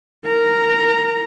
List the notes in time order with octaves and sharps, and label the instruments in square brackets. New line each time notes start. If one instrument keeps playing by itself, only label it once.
[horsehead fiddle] A#4 A#5